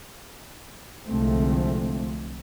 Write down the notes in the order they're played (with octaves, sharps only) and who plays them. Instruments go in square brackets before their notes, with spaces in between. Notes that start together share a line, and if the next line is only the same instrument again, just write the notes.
[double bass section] C2 D3 F3 G#3 A3 C4